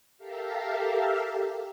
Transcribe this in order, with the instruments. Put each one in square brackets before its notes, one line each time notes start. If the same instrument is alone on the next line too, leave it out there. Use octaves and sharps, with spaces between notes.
[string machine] G4 A4 A#4 E5 F5